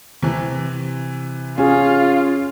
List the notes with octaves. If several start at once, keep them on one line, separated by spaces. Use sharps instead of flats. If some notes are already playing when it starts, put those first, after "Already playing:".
C3 E3
C#4 F4 G#4